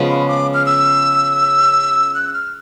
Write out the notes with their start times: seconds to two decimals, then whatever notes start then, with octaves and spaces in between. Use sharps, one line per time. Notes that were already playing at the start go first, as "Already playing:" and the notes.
Already playing: C#3 F3 G#3 B3
0.10 B5
0.28 D6
0.54 F6
0.66 E6
2.15 F#6
2.34 F6